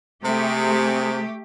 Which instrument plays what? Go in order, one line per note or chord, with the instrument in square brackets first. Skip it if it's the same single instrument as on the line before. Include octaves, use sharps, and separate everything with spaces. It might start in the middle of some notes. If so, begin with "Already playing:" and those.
[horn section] C3 G#4 [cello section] A3 G4